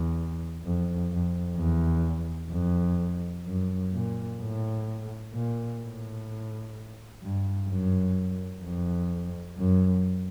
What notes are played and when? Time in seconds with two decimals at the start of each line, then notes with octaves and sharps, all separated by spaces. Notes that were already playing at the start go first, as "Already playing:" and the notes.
Already playing: E2
0.64 F2
1.11 F2
1.57 E2
2.51 F2
3.46 F#2
3.92 A#2
4.40 A2
5.33 A#2
5.81 A2
7.22 G2
7.69 F#2
8.64 F2
9.57 F#2